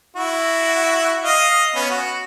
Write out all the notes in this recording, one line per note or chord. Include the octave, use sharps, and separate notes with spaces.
E4 F#4
D#5 F5
B3 C#4 B5
F#4